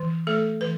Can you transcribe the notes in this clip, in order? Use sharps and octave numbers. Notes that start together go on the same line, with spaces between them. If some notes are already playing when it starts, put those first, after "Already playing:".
Already playing: E3
A3 A4
E3 B4